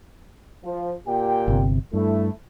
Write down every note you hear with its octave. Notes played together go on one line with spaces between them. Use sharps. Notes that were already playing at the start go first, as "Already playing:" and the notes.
F3
A#2 G4 G5
G1 C3
G2 A3 E4